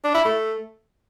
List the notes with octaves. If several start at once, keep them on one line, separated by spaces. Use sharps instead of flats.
D4
E4
A3